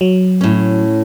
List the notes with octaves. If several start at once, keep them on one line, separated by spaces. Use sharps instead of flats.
F#3
A2 C#4